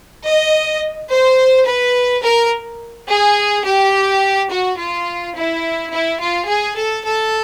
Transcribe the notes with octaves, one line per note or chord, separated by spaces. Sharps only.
D#5
C5
B4
A#4
G#4
G4
F#4
F4
E4
E4
F4
G#4
A4
A4